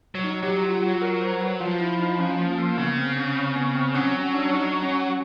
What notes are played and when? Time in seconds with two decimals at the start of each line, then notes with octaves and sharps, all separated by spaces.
0.15 F#3
0.24 D#4
0.43 F#3 G4
0.63 F4
0.74 F4
0.83 F#4
1.02 A#4
1.21 C5
1.41 B4
1.60 F3 F4
1.80 E4
1.99 D#4
2.19 C#4
2.38 A#3
2.58 A#3
2.77 C#3 B3
2.97 C4
3.17 C#4
3.36 C4
3.56 B3
3.75 C4
3.95 F#3 C#4
4.14 C#4
4.34 D4
4.53 D#4
4.83 C#4